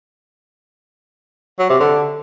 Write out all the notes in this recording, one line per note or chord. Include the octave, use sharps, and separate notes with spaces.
F#3
C3
D3